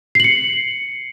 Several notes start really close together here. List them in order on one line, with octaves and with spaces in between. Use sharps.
C7 F#7 C#7